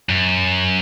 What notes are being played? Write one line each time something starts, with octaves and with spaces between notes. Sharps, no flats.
F#2